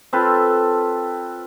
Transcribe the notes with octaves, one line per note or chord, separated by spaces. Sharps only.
C4 F4 A4 B4